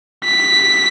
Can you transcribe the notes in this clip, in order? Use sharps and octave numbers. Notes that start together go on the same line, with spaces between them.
B6